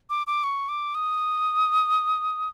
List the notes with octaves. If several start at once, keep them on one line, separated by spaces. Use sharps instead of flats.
D6
D6
C#6
D6
D#6